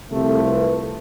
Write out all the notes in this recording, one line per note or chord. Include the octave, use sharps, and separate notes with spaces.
C2 C3 F3 A3 A4
B4